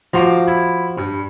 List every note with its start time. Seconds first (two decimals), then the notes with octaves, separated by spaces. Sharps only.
0.13 F3 F4 F#4 A#5 D6
0.48 E4
0.98 G2